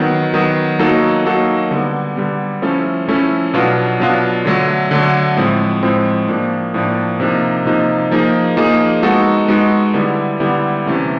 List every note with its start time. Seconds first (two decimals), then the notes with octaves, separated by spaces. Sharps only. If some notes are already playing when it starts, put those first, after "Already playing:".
Already playing: D#3 F#3 B3
0.34 D#3 F#3 B3
0.79 F#3 A#3 D#4 F#4 A4
1.25 F#3 A#3 D#4 F#4 A4
1.71 D3 G3 B3
2.17 D3 G3 B3
2.62 F3 A3 C#4 E4 A4
3.08 F3 A3 C#4 E4 A4
3.54 B2 F#3 B3 D4 F4
4.00 B2 F#3 B3 D4 F4
4.45 D3 F#3 A3
4.91 D3 F#3 A3
5.37 A2 F3 G#3 C4
5.83 A2 F3 G#3 C4
6.28 A2 F3 A#3 D4
6.74 A2 F3 A#3 D4
7.20 C3 F3 A#3 D#4
7.66 C3 F3 A#3 D#4
8.11 F3 A#3 D#4 G#4
8.57 F3 A#3 D#4 G#4
9.02 G#3 B3 D#4 F#4 A4
9.48 G#3 B3 D#4 F#4 A4
9.94 D3 G3 B3 E4
10.40 D3 G3 B3 E4
10.86 C3 E3 A3 C#4